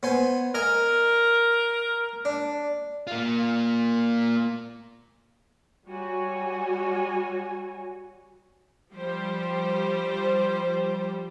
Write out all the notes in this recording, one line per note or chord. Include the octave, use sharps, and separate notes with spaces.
B3 C5 G#5
A#4 D#5 G#5 A#5
D4
A#3 F4
G3 F#4 C#5 G#5
F3 G3 G4 C5